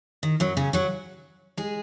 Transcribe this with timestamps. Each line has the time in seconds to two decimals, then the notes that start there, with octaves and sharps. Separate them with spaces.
0.23 D#3
0.40 F#2 F#3
0.57 C#3 C#4
0.73 F#3 F#4
1.57 G#3 G#4